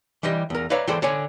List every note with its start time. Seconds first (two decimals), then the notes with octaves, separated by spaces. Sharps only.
0.23 E3 G3 G4 D#5
0.50 E2 A#4
0.70 B4 C#5 D5 E5 F5 A#5
0.87 E3 G#3 G4 A4 C5 D5
1.02 D3 C#5 D5 G#5